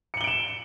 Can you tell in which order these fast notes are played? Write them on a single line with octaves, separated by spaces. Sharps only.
C#7 F#7 G7 D7 E7